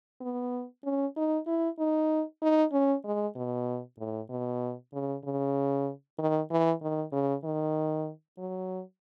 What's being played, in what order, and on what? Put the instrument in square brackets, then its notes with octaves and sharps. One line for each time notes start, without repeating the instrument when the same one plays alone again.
[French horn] B3
C#4
D#4
E4
D#4
D#4
C#4
G#3
B2
A2
B2
C#3
C#3
D#3
E3
D#3
C#3
D#3
F#3